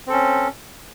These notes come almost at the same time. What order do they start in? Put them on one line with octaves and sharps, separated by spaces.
C4 A4 C#4